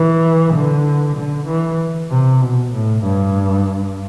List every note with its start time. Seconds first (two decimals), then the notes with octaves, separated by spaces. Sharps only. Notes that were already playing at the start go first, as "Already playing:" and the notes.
Already playing: E3
0.54 D3
1.16 D3
1.47 E3
2.10 C3
2.41 B2
2.72 A2
3.03 G2